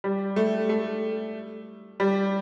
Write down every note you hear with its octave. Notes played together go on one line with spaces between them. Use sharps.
G3
A3
A3
G3